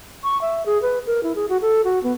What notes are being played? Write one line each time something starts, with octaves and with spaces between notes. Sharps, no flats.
C#6
E5
G#4
B4
A#4
E4
G#4
F#4
A4
F#4
B3